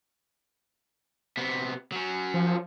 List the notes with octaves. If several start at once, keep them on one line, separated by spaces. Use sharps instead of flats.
C3 B3
F#3 C#4
F3